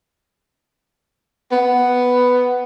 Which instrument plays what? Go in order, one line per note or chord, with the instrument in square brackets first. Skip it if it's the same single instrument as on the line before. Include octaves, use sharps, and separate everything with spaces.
[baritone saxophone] B3